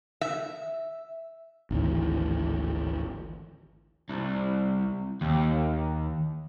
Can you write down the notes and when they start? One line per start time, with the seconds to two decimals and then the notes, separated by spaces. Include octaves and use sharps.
0.21 E5
1.71 G#1 D2 A2 E3
4.10 C2
5.21 D#2